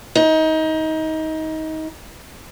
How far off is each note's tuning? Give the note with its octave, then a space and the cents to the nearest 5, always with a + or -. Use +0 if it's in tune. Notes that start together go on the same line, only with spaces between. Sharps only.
D#4 +25